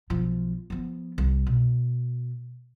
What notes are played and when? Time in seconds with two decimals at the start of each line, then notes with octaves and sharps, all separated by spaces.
0.10 B1 F3
0.70 F3 B3
1.18 C2
1.47 B2